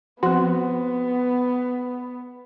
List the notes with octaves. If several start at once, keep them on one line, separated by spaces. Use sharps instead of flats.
F3 B3 C4 F#4